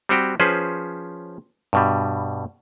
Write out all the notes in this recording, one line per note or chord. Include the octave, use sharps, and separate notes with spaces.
G3 C4 F#4 G4
F3 C#4 G#4 B4 C5
G2 B2 G3